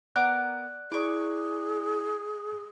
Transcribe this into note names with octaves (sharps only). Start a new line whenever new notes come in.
B3 A#4 D5 D6 F#6
E4 G#4 D5 C#6 D6